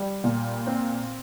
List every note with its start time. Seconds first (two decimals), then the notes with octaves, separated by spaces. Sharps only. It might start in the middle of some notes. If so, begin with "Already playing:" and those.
Already playing: G3
0.24 A#2
0.67 C4